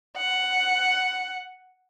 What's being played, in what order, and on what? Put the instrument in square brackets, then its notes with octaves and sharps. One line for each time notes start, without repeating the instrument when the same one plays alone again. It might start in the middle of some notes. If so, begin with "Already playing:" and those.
[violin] F#5